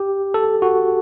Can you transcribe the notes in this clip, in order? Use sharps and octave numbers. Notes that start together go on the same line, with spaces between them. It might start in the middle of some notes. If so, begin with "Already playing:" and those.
Already playing: G4
A4
F#4